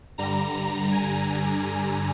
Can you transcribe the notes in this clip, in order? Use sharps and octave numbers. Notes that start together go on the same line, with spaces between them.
G2 D3 G3 A#5
G#5
A#5
G#5